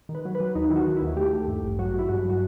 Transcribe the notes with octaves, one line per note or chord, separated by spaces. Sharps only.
D#3
B4
F#3
B4
F#3
D#2 D#4
D#3 E4
F#4
D#3
E4
D#2
A3 G4
A3
G2
A1
F#3 F#4
F#3 E4
G2 F#4
F#3 F#4